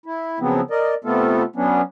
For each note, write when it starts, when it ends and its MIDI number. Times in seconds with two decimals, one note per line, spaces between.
0.06 0.39 64
0.40 0.61 49
0.40 0.61 53
0.40 0.61 54
0.40 0.61 59
0.40 0.61 60
0.71 0.94 70
0.71 0.94 74
0.71 0.94 75
1.05 1.43 48
1.05 1.43 57
1.05 1.43 59
1.05 1.43 65
1.05 1.43 69
1.56 1.82 54
1.56 1.82 59
1.56 1.82 61
1.56 1.82 62